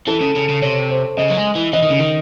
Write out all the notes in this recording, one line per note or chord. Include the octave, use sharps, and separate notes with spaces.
E3 A4
C#3
C#3
C#3
C3 C#5
C5
C#3 D#5
F#3
G#3
E3
E3 D#5
D#3
C#3
D#3